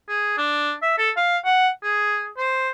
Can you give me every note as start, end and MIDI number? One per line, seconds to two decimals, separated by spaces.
0.08 0.35 68
0.38 0.73 62
0.82 0.95 76
0.98 1.10 69
1.17 1.37 77
1.45 1.68 78
1.83 2.28 68
2.38 2.69 72